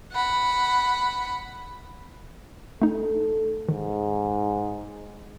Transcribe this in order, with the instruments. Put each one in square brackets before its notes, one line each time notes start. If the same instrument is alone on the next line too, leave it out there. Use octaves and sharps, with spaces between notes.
[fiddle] F#5 B5
[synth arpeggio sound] A3 D#4 [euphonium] A4
[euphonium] G#2 [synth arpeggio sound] D#3